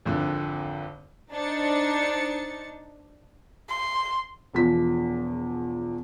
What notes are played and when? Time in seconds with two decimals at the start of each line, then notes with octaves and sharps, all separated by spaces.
0.05 G#1 F2 D3
1.32 D4 D#4 C5 A6 C#7
3.69 C6
4.54 E1 E2 F3 B6